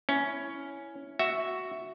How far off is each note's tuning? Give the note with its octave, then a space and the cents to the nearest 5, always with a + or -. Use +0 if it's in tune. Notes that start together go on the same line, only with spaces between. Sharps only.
C#4 +5 E4 +0
F#4 +0 E5 +0